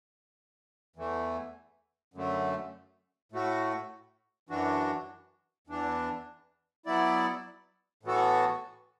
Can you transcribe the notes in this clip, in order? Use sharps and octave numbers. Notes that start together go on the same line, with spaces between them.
E2 E3 A3
F#2 D3 A3
A2 A3 F#4
F#2 E3 D4 F#4
E2 E3 D4
F#3 B3 E4 D5
A2 E3 B3 F#4 A4